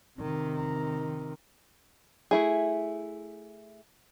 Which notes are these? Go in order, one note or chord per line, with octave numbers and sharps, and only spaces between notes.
C3 D#3
A3 E4 G#4